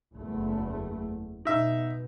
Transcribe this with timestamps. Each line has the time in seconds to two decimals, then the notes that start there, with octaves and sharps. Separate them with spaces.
0.13 F#1 E2 A3
1.45 B2 D#4 E5